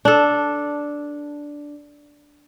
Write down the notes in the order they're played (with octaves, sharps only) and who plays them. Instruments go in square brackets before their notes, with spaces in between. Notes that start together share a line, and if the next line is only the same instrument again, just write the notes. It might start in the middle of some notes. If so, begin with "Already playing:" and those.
[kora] D4 A4